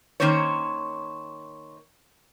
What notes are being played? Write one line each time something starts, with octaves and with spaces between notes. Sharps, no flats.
D#3 A#3 C#4 C5 C#5